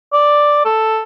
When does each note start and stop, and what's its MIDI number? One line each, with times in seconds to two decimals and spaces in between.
0.13 0.62 74
0.65 1.02 69